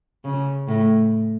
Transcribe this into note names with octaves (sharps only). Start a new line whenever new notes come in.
C#3
A2